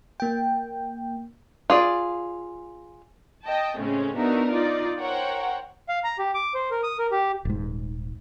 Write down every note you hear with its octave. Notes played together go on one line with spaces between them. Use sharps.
A#3 G5
F4 G#4 D5
D#5 G5 A5
A2 C#3 G#3 A3 C4 C#4
B3 D4 D#4 F#4 A#4 E5
D#4 F4 D5
A#4 C5 C#5 F#5 G5
F5
A#5
G4
D6
C5
A#4
D#6
A#4
G4
D#1 G#2